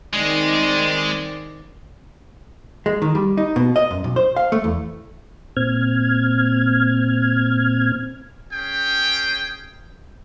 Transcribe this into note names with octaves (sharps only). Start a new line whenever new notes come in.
D#3 G#3 C4 D5
G#3
D#3
G3
D#4
B2
D#5
F#2
B1
C5
F5
A3
E2
A#2 C4 F6 G#6
C#4 G#4 G5